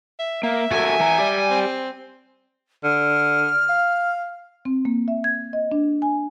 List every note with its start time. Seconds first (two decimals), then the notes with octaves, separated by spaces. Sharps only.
0.19 E5
0.43 A#3 E5
0.72 F#4 A4 A#4 G#5
1.00 E3 A#5
1.19 G4 D5
1.50 C4
2.84 D3 F6
3.69 F5
4.65 C4
4.85 A#3
5.08 E5
5.24 G#6
5.53 D#5
5.72 D4
6.02 G#5